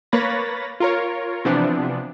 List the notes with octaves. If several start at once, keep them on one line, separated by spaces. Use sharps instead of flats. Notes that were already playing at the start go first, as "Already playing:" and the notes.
A#3 B4 C#5 B5 A6 A#6
F4 A#4 C#5
C3 E3 F3 B3 D4